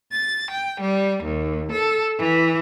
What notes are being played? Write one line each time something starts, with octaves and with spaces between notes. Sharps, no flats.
A6
G5
G3
D#2
A4
E3